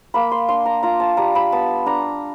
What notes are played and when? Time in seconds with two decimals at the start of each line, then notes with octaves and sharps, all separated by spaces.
0.14 A#3 B5
0.31 C6
0.48 D4 C6
0.65 A#5
0.83 F4 A#5
1.00 A5
1.17 G3 A#5
1.35 B5
1.52 B3 A5
1.86 D4 A#5